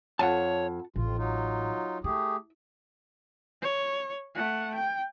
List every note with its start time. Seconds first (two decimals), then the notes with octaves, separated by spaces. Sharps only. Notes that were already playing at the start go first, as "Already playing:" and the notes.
0.19 F2 C#5 F#5 G#5 A5
0.96 A1 F2 F4
1.18 F#3 D#4 F4
2.04 A3 E4 G4 G#4
3.62 C#5
4.35 A3 F#5
4.75 G5